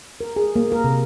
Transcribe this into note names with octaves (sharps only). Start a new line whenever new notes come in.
A#4
G#4
A#3
A#4
C3